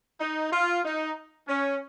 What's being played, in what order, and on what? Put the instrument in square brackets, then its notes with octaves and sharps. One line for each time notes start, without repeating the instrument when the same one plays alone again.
[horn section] D#4
F4
D#4
C#4